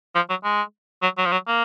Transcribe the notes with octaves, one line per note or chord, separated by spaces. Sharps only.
F3
F#3
G#3
F#3
F#3
F3
F#3
A#3